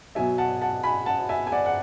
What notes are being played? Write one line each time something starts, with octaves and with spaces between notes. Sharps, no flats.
B2 F#3 E5 G#5
F#5 A5
F#5 A5
G#5 B5
F#5 A5
E5 G#5
G#5
D5 F#5
F#5